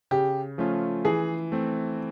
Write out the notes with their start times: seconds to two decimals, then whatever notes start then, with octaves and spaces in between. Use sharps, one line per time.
0.11 C#3 G4
0.58 F3 A3 C#4 F4
1.05 E3 G#4
1.52 A3 C4